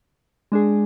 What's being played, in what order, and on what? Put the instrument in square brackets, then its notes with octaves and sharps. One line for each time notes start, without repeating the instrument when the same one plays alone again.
[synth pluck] G#3 D4 G#4